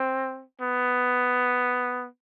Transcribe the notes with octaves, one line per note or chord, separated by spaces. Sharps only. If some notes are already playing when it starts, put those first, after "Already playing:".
Already playing: C4
B3